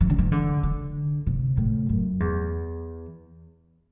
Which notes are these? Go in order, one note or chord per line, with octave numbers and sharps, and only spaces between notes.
E3
D3
E3
D3
D3
C3
A2
F#2
E2